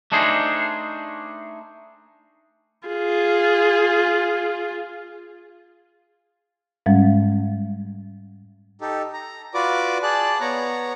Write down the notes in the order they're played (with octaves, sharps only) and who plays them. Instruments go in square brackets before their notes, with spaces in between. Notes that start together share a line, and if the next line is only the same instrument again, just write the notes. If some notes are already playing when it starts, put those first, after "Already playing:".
[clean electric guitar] A3 D4 D#4 G#4 C5
[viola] F4 G#4
[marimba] G#2 G3 G#3 C#4
[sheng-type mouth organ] D#4 G4 A4
A#5
F4 F#4 B4 D5 D6
G#4 D5 A5 F#6
B3 C#5 A#5